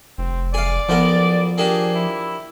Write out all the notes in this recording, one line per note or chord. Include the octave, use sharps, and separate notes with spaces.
F1 C4
G#4 D5 F5
B1 F3 B3 A#4
A#3 D4 G4 G#4
E4